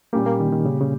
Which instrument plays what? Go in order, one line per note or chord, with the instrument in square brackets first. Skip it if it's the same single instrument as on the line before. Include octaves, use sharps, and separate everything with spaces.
[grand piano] A#2 G3 C#4 G4 [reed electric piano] A#3
[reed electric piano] A#3
D#3
D#3
C#3
C#3